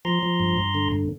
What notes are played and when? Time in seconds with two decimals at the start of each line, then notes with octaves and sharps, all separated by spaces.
0.05 F3 A#5 C6
0.23 F3
0.40 G2
0.57 G2
0.75 D3
0.92 G2